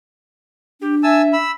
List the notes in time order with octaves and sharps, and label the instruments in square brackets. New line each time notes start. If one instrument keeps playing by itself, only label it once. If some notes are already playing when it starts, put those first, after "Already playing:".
[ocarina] D4 [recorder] G4
[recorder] E5 [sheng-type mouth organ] G#5 A5 E6
[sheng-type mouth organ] B5 E6